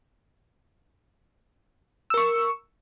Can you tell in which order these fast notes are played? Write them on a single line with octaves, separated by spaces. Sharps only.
E6 A#4 C#6